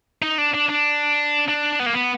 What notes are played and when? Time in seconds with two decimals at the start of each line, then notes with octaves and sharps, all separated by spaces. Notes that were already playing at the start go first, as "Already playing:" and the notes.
0.22 D#4
0.38 D4
0.54 D4
0.69 D4
1.48 D4
1.79 B3
1.86 A#3
1.94 B3